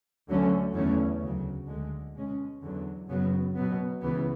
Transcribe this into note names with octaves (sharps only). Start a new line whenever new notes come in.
D2 D3 F#3 A3 C#4
E2 D3 A3 C#4
D2 C#3 F#3
D2 D3 G#3
B2 G#3 C#4
E2 D3 F#3
F#2 C#3 F#3 B3
B2 F#3 B3
C#2 C#3 E3 B3